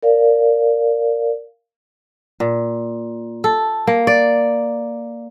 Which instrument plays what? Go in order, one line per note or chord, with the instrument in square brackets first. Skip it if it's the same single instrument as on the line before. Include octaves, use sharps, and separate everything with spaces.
[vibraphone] A#4 D5 F5
[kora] A#2
A4
A#3
D5